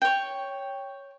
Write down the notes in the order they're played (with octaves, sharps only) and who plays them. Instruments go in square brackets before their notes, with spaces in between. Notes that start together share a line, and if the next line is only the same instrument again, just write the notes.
[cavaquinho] C#5 G5